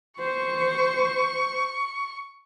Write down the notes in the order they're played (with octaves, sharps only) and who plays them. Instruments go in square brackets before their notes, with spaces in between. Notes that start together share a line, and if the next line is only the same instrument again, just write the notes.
[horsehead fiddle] C5 [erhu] C#6